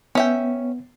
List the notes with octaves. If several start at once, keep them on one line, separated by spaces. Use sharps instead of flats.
B3 C#4 E5 G5